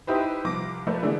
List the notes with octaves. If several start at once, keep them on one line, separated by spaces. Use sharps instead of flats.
D#4 E4 G4 B4 C5
C2 F3 D6 A#6
F3 A3 A#3 B4 D5
D3 E3 G#3 A3 D4